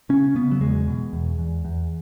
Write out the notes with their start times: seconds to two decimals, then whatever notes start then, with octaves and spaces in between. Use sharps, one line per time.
0.09 C#3 C#4
0.35 C#3 B3
0.51 F#3
0.61 E2 G#3
0.88 B2
1.13 E2
1.39 E2
1.65 E2